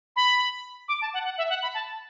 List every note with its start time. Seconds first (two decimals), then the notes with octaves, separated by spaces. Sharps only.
0.16 B5
0.88 D6
1.02 A5
1.14 F#5
1.25 F#5
1.38 E5
1.49 F#5
1.62 B5
1.74 A5